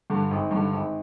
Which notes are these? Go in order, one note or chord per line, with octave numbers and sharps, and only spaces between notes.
G2 D3
G#1
G2 D3
G#1